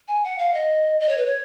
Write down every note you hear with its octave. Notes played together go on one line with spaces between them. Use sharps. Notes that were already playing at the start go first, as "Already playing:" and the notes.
G#5
F#5
F5
D#5
D#5
C#5
B4
C#5